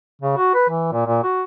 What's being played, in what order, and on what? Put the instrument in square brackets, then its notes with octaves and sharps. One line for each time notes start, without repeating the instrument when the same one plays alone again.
[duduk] C#3
F#4
B4
E3
A#2
A#2
F#4